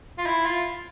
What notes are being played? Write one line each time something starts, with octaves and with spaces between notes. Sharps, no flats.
F4
E4
F4